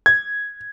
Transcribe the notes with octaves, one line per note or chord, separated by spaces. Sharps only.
G#6